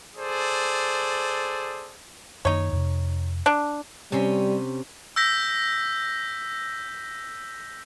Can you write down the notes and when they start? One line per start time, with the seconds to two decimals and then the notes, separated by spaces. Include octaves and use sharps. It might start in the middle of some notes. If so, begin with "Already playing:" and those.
0.17 G#4 A4 C5 D5
2.45 F#2 D#3 A#3 D#4 C#5
2.73 F2 C3
3.46 D4
4.12 C3 G3 C#4 C6
5.16 E6 G6 A#6 B6